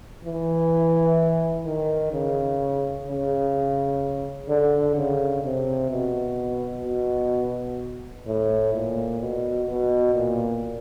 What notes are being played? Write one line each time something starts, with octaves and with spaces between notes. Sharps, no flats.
E3
D#3
C#3
C#3
D3
C#3
C3
B2
B2
A2
A#2
B2
B2
A#2